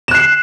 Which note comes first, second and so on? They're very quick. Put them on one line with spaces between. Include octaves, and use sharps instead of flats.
E7 F#6 C7